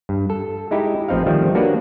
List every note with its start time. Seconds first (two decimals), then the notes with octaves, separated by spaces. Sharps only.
0.09 G2
0.30 A4
0.71 G#3 D#4 E4 G4
1.08 A1 F3 C4 D#4 F5
1.26 D#3 F3 G3 A3 C4
1.55 A#3 D4 F#4 B4 C#5 D5